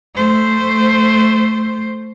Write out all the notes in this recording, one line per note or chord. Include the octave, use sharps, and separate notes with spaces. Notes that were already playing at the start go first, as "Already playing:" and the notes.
A3 C5